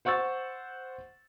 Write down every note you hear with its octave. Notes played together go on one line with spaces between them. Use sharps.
C5 F#5 C#6 E6 A6